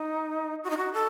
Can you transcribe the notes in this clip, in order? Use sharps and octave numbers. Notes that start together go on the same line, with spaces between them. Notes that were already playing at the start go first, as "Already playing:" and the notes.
Already playing: D#4
F#4
D#4
F#4
A4